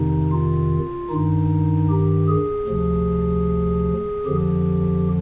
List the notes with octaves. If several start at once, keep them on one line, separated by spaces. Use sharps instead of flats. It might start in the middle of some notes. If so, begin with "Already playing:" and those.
Already playing: F2 C3 D#3 D#4
F4
G2 D#3 D#4
G4
G#4
D2 C3 F3
F2 D3 F3 G4